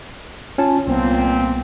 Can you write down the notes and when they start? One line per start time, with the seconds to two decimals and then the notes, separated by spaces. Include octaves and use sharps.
0.58 C#4 F4 A5
0.87 C2 A#2 B3 C4